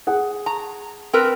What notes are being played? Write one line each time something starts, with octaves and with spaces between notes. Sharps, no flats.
G#4 F#5
A#5
C4 A#4 B4